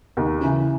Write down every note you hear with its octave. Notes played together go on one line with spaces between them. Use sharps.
D#2
C#3 E3